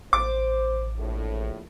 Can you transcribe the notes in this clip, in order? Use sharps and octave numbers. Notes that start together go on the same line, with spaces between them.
A1 C5 D6
A#1 A2